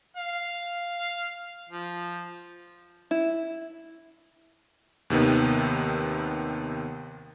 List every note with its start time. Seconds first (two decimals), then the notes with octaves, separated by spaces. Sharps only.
0.17 F5
1.69 F3
3.11 E4
5.10 D#2 C3 D#3 B3